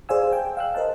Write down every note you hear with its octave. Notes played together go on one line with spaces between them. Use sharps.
G#4 C5 D5 F5 G#5 E6
G5
F5 E6 F#6
A#4 C5 D#5 A5